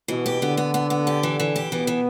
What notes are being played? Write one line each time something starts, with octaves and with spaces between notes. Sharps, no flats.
B2 E3
G4
D3 B3
B3
B3
B3
G4
E3
E3
G4
B2 E3 B3
E3